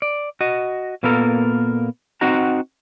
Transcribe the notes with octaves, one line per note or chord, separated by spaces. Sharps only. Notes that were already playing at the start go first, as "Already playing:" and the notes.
D5
F#4 D#5
A#2 A#3 B3 A4 A#4
C4 D#4 F#4 F#5 A#5